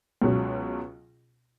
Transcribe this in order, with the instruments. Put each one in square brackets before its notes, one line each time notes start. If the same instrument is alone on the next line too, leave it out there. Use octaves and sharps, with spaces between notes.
[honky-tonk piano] C#2 B2 F#3